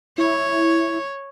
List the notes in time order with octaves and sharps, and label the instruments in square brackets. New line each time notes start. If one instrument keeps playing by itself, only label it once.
[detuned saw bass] E4 [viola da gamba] C#5